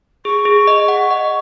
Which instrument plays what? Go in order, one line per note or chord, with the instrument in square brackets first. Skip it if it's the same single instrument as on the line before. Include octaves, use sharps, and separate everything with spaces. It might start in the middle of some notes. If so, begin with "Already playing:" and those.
[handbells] G#4 [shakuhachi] C#6
[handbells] G#4
D#5
F#5
D#5